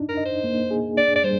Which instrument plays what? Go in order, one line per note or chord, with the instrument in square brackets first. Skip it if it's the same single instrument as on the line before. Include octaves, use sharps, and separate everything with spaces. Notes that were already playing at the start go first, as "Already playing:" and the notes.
Already playing: [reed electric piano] D4 D#4
[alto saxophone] A#4
[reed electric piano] D#5
[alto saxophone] C5
[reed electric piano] A#3
G#4
[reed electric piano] D4 [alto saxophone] D5
[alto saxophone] D5
[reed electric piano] G3 [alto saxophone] C5